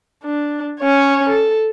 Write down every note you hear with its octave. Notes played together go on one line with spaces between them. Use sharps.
D4
C#4 C#5
A4